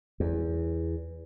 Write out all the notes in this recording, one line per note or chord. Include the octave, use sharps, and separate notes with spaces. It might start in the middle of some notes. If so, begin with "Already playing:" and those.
E2